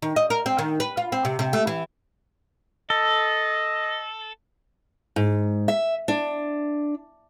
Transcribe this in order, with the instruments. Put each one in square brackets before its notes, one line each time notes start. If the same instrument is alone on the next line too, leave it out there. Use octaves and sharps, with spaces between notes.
[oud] D#3
D#5
A#4
C4
D#3
B4
F4
C4
C3
C3
A3
E3
[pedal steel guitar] A4 [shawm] D#5
[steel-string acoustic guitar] G#2
E5
D4